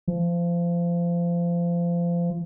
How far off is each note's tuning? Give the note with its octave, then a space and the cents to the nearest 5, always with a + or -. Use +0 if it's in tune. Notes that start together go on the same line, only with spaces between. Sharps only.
F3 -25